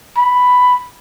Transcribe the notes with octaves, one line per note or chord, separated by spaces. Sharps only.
B5